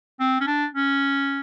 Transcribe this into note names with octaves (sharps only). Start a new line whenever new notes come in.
C4
C#4
D4
C#4